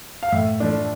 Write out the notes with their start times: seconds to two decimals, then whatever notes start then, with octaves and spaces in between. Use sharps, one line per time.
0.23 F5
0.32 A2 E5
0.60 F3 A3 D4